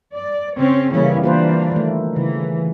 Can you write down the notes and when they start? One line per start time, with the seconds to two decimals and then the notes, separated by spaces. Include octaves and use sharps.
0.16 D5
0.59 C#3 C4 C#4 C#5
0.93 C#3 E3 G3 A#3 C#4 E4
1.24 E3 A#3 D4 F4 B4 C5
1.72 D#3 A3
2.16 C#3 E3